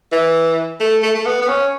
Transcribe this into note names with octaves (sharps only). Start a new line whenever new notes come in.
E3
A3
A3
A3
B3
B3
C#4